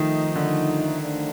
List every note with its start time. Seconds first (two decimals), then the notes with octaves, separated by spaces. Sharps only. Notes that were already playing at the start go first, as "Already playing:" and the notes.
Already playing: D#3 F3 A3 D#4
0.36 D3
1.00 F3 A3 D4